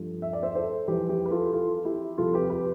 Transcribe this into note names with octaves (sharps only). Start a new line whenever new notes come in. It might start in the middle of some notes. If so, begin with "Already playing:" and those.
Already playing: G2 F3 A3
E5
D5
C5 E5
A4 C5
F2 E3 G3 G4 B4
G4 B4
B4
F4 A4
F4 A4
E4 G4
F2 C3 G3 F4 A4
G4 B4
G4 B4